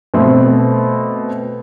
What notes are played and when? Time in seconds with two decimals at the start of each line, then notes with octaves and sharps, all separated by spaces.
0.14 B2 A3 C4